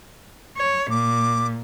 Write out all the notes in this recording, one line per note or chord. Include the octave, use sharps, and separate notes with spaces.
C#5
A#2 D6